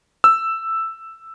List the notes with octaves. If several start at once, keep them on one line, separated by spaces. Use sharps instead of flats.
E6